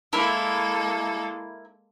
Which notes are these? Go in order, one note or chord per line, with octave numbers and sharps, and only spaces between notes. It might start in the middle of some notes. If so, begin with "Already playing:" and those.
G#3 A#3 E4 A4 A#4